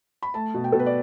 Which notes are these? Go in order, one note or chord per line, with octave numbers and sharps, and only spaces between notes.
B5
A3 A5
B2
G5
B2 A4
B4
D5